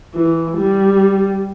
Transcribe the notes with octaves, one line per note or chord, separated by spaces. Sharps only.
E3
G3